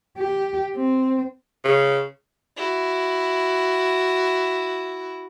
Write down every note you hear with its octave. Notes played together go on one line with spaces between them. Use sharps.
G4
C4
C#3
E4 F#4